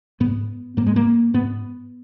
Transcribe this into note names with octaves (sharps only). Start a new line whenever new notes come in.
G#2 B3
G#2 A#3
G#3
A#3
G#2 B3